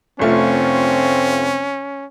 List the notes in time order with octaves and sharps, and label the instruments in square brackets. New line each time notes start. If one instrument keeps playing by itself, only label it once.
[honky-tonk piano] F1 A3 F4 [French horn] C4 [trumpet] C#4